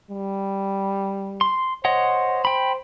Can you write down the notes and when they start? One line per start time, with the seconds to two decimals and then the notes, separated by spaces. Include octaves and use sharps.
0.11 G3
1.41 C6
1.85 C5 C#5 D#5 F#5
2.45 G5 B5